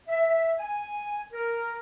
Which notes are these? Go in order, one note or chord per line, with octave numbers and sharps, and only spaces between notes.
E5
G#5
A#4